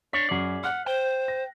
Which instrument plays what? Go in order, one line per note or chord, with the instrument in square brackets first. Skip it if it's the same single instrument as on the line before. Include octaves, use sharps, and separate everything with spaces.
[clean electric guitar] D4 C#5 [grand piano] B6 C#7
[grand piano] F#2 F#4 C7 [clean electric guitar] G#4 D5
[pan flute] F#5 [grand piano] F6 F#6
[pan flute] C5 [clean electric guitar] G5
[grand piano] A#6